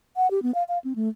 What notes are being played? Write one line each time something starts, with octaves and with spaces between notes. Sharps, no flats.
F#5
G4
B3
F5
F5
C4
A3